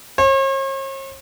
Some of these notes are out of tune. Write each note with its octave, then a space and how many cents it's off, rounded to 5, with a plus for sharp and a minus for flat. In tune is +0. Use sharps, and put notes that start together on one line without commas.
C#5 -45